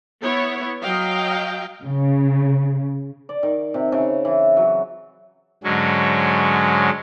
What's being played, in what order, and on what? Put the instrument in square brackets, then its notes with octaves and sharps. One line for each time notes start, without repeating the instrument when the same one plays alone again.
[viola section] B3 E4 C#5
F#3 D#5 F5 G5
[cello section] C#3
[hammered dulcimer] D5
D#3
C3
C#3
E3
F#3
[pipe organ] G#2 D3 F#3 G#3 C#4